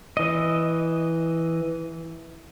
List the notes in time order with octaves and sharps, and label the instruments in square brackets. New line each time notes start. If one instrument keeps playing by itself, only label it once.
[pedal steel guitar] E3 D#5